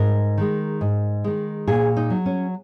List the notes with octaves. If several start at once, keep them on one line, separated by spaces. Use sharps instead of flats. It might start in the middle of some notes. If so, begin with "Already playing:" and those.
Already playing: G#2 A#4
D#3 G#3
G#2
D#3 G#3
A#2 G#4
D#4
F#3
C#4